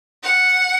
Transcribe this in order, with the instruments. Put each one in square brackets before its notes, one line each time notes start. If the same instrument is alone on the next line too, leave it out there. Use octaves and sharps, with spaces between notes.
[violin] F#5